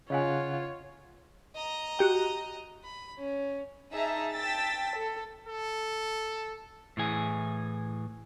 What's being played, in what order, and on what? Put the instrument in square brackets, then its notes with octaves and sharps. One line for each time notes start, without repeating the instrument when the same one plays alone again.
[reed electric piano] C#3 F#5 F#6 [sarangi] F4 [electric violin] C#5 [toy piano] D#5 F5 G#5
[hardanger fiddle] D#5 A#5
[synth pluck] F#4 G4 G5
[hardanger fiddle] B5
C#4
[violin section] D#4 G#4 E5 A5 A#5
G5 A5 E6 A6 B6
A4
[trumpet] A4
[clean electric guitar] A2 E3 G#4